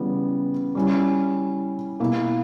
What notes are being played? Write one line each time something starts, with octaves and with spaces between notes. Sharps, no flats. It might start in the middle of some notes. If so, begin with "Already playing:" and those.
Already playing: C#3 E3 G3 B3
G3 C#4 E4
B2 A#3 E4